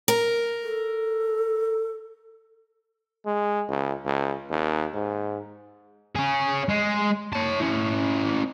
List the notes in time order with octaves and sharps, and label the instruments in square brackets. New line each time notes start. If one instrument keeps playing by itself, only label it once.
[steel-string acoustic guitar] A#4
[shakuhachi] A4
[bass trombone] G#3
C#2
C#2
D#2
G#2
[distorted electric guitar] C#4 G#4
G#3
C#5 A5
C#4 E4